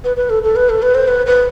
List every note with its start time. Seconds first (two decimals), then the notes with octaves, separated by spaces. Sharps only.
0.04 B4
0.17 B4
0.30 A4
0.43 A4
0.56 B4
0.69 A4
0.82 B4
0.95 C5
1.08 B4
1.26 B4